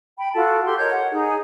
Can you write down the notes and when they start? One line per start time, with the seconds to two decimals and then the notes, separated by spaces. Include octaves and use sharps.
0.18 G5 B5
0.34 F4 F#4 A4 A5
0.66 G4 A4 C6
0.78 A#4 C#5 D#5 G6
0.91 F#5
1.11 D#4 G#4